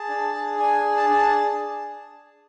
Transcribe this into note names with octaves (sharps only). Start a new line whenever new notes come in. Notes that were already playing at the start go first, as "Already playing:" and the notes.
Already playing: G#4 A5
D4
G#4
D4 G#5
G#4
A5
D4 A5